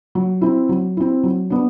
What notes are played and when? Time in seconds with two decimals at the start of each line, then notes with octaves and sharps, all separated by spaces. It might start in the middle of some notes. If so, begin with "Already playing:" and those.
0.15 F#3
0.41 C4 E4
0.69 F#3
0.97 C4 E4
1.23 F#3
1.50 B3 D4